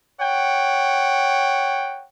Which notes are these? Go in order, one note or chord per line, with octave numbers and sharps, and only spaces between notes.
C#5 F#5 G5